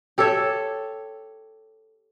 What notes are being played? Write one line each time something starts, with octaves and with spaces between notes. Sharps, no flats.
G4 A4 C#5 E5